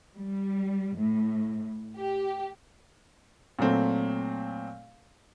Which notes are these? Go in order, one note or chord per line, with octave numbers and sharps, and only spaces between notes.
G3
A2
G4
A#2 F#3 A3 C4